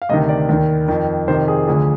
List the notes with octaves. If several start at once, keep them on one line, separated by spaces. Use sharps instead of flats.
F5
D2 C3 D#3 D#5
D5
D#2 D#3
F2 D#3
F2 C3 D#3 C5
G#4
D2 D3 F3 G#4